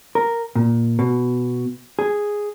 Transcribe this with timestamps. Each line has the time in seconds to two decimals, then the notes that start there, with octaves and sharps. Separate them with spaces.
0.15 A#4
0.55 A#2
0.99 B2
1.99 G#4